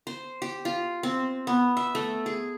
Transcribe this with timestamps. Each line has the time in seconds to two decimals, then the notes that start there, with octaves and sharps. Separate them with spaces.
0.07 C5
0.42 G4
0.65 F4
1.03 C4
1.47 B3
1.77 E5
1.95 A3
2.26 G#4